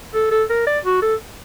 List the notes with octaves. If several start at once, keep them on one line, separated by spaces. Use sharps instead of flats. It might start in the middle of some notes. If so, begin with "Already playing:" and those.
A4
A4
A#4
D5
F#4
A4